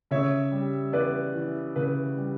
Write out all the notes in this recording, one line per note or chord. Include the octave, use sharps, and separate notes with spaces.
C#3 C#5 E5
G3
E2 B4 D5
E3
C#3 B4
G3